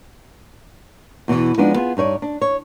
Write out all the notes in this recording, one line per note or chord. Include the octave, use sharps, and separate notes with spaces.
E2 B2 D3 E3
F3 G#3 B3 D4 D#4
B3 F4 G#4
G2 D#4 C#5 D5
D4
C#5